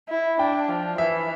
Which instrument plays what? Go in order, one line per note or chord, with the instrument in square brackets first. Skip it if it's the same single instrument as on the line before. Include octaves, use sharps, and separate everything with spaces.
[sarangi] E4
[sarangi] D4 [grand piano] G5
[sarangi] F3
[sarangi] E3 [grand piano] E5